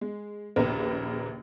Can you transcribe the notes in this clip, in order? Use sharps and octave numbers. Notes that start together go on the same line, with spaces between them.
G#3
A#1 D#2 C#3 A#3 A#4 B4